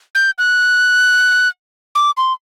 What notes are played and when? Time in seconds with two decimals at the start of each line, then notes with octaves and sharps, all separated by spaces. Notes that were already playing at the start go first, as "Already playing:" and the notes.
0.15 G6
0.38 F#6
1.95 D6
2.17 C6